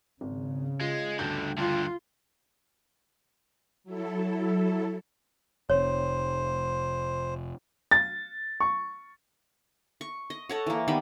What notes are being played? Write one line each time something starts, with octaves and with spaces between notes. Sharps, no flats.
G#1 C#3
G#3 F4
D2 G2 D3 G6
G2 D3 F4
F#3 E4 A4
F1 C5 C#5
A6
C#6
C#6
D#5
A4 C#5 F#5
E3 A#3
D#3 G3 B3 B5